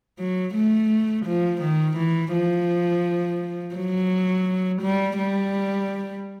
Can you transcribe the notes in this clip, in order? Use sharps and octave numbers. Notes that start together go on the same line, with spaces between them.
F#3
A3
F3
D#3
E3
F3
F#3
G3
G3